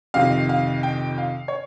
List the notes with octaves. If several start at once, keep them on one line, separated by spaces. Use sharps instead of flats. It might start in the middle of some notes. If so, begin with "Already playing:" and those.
F2 C3 D#3 F5
F5
G5
F5
C#5